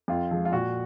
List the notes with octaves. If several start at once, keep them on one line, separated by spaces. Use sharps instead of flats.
F2 F4
F3 G#3
F4
A#2 F#4